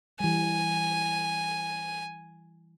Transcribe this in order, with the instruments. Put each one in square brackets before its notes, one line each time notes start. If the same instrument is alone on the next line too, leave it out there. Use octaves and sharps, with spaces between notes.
[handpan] E3 G3 [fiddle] G#5